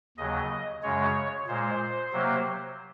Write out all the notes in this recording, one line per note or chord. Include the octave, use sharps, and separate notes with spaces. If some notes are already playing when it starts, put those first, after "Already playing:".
D#2 C#3 F#3 D#5
F#2 C#3 G#3 C#5
A#2 G#3 C5
C3 F#3 A#3